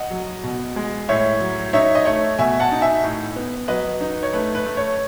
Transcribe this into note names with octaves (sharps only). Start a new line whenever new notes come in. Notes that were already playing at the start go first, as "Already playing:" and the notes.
Already playing: D#5 F#5
F#3
B2
G#3
A2 C#5 E5
F#3
D#4 C#5 E5
D#5
A3 C#5 E5
B2 E5 G#5
F#5 A5
D#4
E5 G#5
A2
B3
F#3 B4 D#5
D#4
C#5
A3 B4
B4
A3
C#5